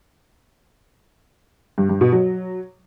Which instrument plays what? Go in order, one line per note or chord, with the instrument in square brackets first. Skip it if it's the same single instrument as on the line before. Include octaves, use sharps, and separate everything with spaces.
[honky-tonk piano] G2
G2
B2
F#3